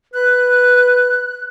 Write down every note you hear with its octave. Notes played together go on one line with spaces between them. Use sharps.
B4 F#6